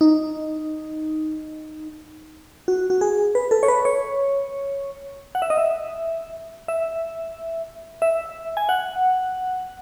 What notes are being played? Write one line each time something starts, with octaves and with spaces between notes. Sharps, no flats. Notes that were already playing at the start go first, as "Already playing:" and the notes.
D#4
F#4
F#4
G#4
B4
A4
C#5
B4
C#5
F#5
E5
D#5
E5
E5
E5
G#5
F#5